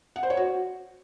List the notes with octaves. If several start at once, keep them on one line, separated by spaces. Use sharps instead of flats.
F#5
C5
C#5
F#4